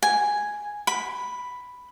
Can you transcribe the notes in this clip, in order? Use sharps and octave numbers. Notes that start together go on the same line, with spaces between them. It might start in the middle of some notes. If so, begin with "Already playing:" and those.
G#5
B5